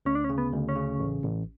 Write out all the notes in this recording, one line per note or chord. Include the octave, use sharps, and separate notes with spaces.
D2 C#4
D4
C#4
C#3
B3
D2
C#4
C#3
A1
A1